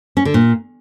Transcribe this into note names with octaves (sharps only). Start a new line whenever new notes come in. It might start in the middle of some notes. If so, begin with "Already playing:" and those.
C#4
D3
A#2